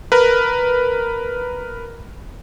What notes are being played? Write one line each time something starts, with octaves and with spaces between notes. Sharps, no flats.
A#4 B4